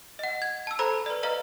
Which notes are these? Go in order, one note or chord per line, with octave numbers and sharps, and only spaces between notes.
D#5 F#5
G#6
A5 E6
A4 C5 A#5 B5 E6
B4 D5
B4 D#5 F5 A#5